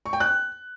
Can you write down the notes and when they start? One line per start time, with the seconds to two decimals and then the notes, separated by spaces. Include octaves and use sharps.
0.06 C#6
0.13 G5
0.20 F#6